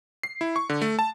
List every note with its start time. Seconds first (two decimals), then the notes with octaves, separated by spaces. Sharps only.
0.23 C7
0.41 E4
0.56 C#6
0.69 D3
0.82 A3
0.99 A5